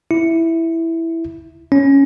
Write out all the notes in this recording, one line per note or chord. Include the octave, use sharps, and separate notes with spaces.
E4
C#4